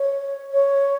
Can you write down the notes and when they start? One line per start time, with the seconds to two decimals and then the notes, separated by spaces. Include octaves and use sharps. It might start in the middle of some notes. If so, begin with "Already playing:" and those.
Already playing: C#5
0.52 C#5